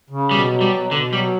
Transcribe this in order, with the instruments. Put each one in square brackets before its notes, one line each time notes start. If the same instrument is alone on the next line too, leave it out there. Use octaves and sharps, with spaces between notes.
[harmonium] C#3
[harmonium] B2 [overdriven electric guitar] G3
[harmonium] F#3
[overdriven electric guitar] G3
[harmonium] B2
[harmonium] B2 [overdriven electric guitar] D3
[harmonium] F#3 [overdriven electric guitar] G3